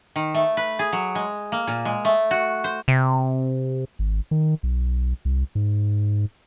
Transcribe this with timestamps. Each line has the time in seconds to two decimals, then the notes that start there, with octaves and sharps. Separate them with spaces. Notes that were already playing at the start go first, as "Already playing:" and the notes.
0.16 D#3
0.35 A3
0.57 B4
0.79 G#4
0.93 F#3
1.15 G#3
1.52 A#3
1.67 A#2
1.85 G#3
2.05 A3
2.31 F#4
2.64 C5
2.88 C3
3.99 G#1
4.31 D#3
4.63 B1
5.25 C2
5.55 G#2